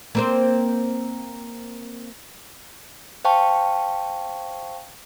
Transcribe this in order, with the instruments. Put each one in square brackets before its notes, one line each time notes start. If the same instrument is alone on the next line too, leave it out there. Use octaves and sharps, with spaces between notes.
[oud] A#3 C4 C5
[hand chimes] C5 F5 G5 A5 C#6